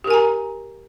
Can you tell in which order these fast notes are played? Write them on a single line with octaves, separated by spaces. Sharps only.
G4 A#4 G#5 A#5